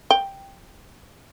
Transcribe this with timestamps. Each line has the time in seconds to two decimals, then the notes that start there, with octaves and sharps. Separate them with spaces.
0.11 G5